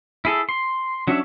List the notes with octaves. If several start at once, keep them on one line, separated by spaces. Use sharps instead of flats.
E4 G#4 A4
C6
F#3 C#4 D4 C#5 E5